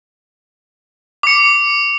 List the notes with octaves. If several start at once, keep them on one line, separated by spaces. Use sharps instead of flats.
D6 C#7